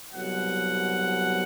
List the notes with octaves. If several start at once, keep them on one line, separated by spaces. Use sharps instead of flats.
C2 B2 F#3 F#5